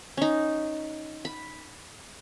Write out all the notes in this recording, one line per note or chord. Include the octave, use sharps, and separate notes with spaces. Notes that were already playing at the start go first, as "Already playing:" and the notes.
C#4 D#4
B5